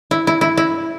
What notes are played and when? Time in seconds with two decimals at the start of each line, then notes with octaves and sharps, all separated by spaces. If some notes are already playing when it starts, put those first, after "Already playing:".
0.11 E4
0.27 E4
0.41 E4
0.57 E4